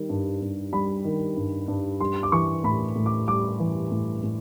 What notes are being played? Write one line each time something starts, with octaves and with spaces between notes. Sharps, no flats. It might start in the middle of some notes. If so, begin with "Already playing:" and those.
Already playing: D#3 G3
G2
G2
G3 B5
D#3
G2
G2
G3 C6
D6
E3 C#6
A2 B5
A2
D6
G3 D6
E3
A2
A2